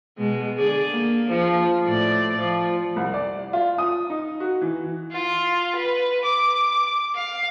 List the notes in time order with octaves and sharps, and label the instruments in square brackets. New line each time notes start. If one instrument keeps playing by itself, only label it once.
[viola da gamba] B2 G#3
D3 G#4 D5
A#3
F3
A2 D5
F3
[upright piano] C2
D5
F4
D#6
D#4
F#4
E3
[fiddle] F4
B4
D6
F5